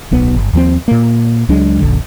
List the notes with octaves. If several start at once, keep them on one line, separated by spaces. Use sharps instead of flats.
D1 B1 B3
G1
D#2 F3 C4
A#2 A#3
C#2 F#3 G#3 D4
D#1 A#1 F#2 D3